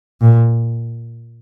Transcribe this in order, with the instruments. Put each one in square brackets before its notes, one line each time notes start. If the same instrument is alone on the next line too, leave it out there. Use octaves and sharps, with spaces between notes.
[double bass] A#2